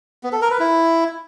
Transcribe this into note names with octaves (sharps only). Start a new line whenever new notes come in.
B3
A4
A#4
B4
E4